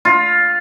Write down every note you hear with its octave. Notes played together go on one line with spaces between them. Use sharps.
F4